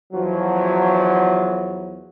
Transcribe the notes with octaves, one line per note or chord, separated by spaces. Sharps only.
E2 F3 F#3